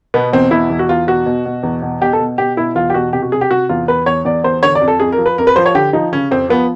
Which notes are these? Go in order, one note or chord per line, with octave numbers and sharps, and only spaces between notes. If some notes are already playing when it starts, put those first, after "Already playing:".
B2 B3
E2 C4
B2 E4
E2
F#4
E2 F4
B2 F#4
B2
B2
E2
B2
B2 G4
A4
B2
B2 G4
B2 E4
E2 F4
G4
B2 F#4
C3 G4
F#4
C3 G#4
G4
C3 F#4
E2 F4
E2 B4
E2 C#5
E2 D5
E2 C5
D3 C#5
D5
F2
A4
F2 G#4
A#4
F3
B4
F2 A#4
B4
F3 C5
C#5
D3 G4
F3 D#4
C#3 C#4
F2 C4
F3 B3